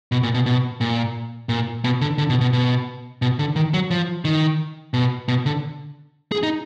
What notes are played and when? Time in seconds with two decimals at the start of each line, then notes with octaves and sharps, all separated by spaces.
0.12 B2
0.23 A#2
0.34 B2
0.46 B2
0.81 A#2
1.49 A#2
1.84 B2
2.01 D3
2.18 D3
2.30 B2
2.41 B2
2.53 B2
3.22 B2
3.39 D3
3.56 D#3
3.74 F#3
3.91 F3
4.25 D#3
4.94 B2
5.28 B2
5.46 D3
6.32 G#4
6.43 D#4